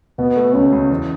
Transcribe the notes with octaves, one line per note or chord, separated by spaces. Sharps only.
B2 B3
A3
C#2 C#4
C#2
E2